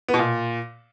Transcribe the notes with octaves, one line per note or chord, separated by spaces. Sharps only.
B3
B2
A#2